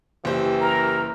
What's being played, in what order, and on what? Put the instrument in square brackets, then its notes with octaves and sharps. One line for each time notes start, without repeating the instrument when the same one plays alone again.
[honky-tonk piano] F#1 C5 [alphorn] E3 [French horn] G4
[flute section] A#4